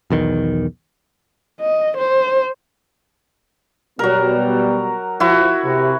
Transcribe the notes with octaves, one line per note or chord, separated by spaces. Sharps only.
B1 E2 D#3
D#5
C5
B2 F#3 G3 B3 A#4
F3 E4 F#4
C3